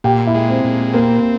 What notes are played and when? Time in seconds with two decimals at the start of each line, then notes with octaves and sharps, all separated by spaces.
0.04 A#2 G4 G5
0.27 E4 E5
0.34 G#3
0.49 C4 C5
0.64 A#2
0.93 A#3 C4 A#4